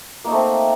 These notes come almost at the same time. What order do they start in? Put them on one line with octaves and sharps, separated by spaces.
A#3 D#4 A3 C4